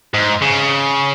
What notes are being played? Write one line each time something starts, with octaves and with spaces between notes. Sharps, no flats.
G#2
C#3